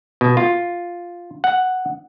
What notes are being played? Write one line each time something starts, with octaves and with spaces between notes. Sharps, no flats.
B2
F4
F#5